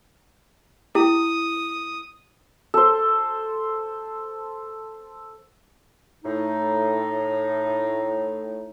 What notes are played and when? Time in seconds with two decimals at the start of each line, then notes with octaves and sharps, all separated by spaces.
0.95 E4 G4 D#6
2.74 A4 C5
6.24 A2 D#4